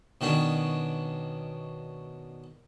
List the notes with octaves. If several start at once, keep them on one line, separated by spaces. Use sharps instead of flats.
B2 D#3 C#4 D4